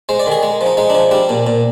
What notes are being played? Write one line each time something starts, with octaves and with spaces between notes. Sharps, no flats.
G#3 C5
D5
D#3
G#4
G#3
F3
D#4
G#3 D#4
D4
F3
G3 D4
A#2
A#2